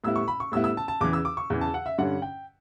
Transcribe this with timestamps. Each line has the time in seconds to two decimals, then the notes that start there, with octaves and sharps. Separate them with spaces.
0.04 A2 G3 B3 E4 E6
0.16 C#6
0.28 B5
0.40 C#6
0.52 A2 G3 B3 E4 E6
0.64 E6
0.77 A5
0.88 A5
1.01 E2 C#3 E3 D6
1.13 E6
1.25 D6
1.37 C#6
1.50 E2 C#3 E3
1.61 A5
1.74 F#5
1.86 E5
1.98 G2 D3 G3 C#4 F#5
2.22 G5